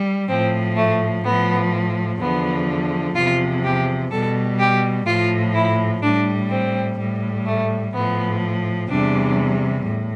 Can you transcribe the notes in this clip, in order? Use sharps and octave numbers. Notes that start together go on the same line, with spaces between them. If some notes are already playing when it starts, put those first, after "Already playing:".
Already playing: G3
A2 F3 C4
A3
A2 F3 B3
E2 D3 F3 B3
E2 C3 F3 F4
G4
B2 G3 A4
G4
A2 F3 F4
E4
A2 G3 D4
C4
A2 G3
A3
A2 F3 B3
E2 C3 G3 D4
A2